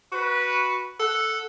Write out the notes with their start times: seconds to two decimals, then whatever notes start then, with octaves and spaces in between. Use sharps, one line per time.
0.11 F#4 B4
0.98 A4 F#5